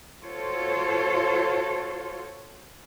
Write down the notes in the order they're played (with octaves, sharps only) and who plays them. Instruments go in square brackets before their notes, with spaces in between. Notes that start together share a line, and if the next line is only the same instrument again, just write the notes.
[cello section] F4 F#4 A4 C5 C#5